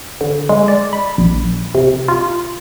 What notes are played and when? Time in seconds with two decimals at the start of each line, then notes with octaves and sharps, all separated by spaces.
0.21 D3
0.49 G#3
0.68 D5
0.93 B5
1.18 A#1
1.75 C3
2.08 F4